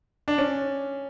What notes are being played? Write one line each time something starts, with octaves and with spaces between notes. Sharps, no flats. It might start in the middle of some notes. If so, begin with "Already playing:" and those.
D4
C#4